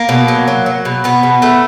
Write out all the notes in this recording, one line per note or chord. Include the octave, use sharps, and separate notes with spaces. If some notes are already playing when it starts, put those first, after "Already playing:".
Already playing: A#3
B2
F#3
F#3
F#3
B2
B2 B3
B2
A3